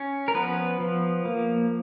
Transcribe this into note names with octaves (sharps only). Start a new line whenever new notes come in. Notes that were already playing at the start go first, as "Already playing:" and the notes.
Already playing: C#4
A#4
F3 B3 B4
F3
A#3